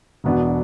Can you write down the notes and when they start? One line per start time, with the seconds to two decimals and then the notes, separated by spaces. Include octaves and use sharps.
0.24 E1 E2 B2 B3 D4